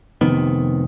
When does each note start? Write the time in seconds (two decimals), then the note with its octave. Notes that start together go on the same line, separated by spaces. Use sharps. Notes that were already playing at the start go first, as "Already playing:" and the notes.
0.21 F1 C3 D#3 B3